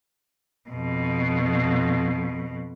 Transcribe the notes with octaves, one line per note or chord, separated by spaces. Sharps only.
F2 B2